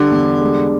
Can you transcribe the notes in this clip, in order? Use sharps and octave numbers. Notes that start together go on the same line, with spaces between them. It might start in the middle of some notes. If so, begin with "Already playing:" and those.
Already playing: D3 G3
E2
G#3